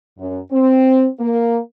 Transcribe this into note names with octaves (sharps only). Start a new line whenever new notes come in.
F#2
C4
A#3